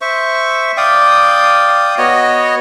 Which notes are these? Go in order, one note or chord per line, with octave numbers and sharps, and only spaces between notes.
C5 E5 C#6
D5 F5 G5 D#6
B3 F#4 C#5 D#5